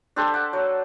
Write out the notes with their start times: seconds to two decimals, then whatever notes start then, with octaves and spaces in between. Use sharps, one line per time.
0.16 D4 G4 A4 C5
0.34 D5 F#5 A5
0.53 F#3